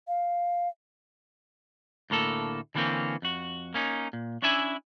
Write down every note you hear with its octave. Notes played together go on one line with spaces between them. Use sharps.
F5
D2 A2 A#3 A4
D3 E3 G3 A#3 C4 C#4
F2 F#4
A#3 C#4 D#4
A#2
C#4 D4 E4 E5 G#5